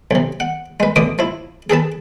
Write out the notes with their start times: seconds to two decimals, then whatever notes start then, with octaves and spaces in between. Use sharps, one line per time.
0.11 B1 C3
0.40 F#5
0.80 G#3 B4
0.96 A1 D2 B2 D6 D#6
1.19 F3 E4
1.70 G#4 A4 B4 A5